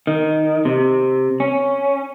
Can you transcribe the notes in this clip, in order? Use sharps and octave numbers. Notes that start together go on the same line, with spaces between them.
D#3
C3
C#4